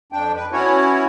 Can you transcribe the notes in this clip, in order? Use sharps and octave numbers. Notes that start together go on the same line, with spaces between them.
F2 D4 G5
B4
B3 C#4 E4 F#4 C#5